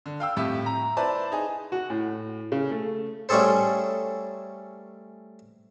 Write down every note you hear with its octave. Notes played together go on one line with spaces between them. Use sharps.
D3
F5 G5 E6
F2 A2 G4 E5
A#5
E4 B4 C5 D5 A5
D#4 G#4
F#4
A2
C#3
A3
G3 A3 C#4 G#4 A4 C5